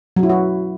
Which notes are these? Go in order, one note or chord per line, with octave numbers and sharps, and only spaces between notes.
F#3
E4
F#4